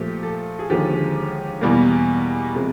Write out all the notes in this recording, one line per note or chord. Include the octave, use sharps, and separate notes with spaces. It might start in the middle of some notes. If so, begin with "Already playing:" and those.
Already playing: A#2 F3 A3 G4
A4
G#4
D#2 D3 F3 G#3 G4
E2 B2 G3 A#3
C3 F3 G#3